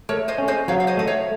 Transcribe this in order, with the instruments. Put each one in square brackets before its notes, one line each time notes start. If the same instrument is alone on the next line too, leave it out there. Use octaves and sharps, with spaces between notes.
[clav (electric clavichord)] A3 [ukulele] A#4 C#5
[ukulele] C5 D#5
[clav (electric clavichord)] C#4
[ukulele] C5 D#5
[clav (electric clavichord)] F#3 [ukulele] C#5 F5
[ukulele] F5
C5 D#5
[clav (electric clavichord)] A3 [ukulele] D#5
[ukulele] C#5 F5